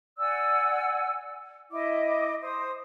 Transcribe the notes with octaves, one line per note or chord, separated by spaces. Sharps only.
D5 F#5 G#5 E6
E4 D#5 D6
C5 D#6